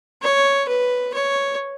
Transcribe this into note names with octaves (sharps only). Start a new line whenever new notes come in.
C#5
B4
C#5